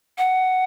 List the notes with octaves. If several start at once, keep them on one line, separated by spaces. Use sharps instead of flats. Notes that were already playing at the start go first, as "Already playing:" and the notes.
F#5